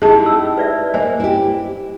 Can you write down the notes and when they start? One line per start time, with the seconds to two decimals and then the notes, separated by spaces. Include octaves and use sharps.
0.02 D#4 E4 G4 G#4 D#5 A5
0.26 C#4 E6
0.58 B4 D5 E5
0.94 A#3 C5 D#5 G#5
1.20 E4 G4